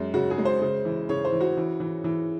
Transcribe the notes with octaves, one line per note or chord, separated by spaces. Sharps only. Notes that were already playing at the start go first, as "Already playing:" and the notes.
Already playing: F#2 G#3
C#3 F#4
G#4
G#3
C5
C#3
E3
C#3 C#5
C5
E3
F#4
E3
E3
E3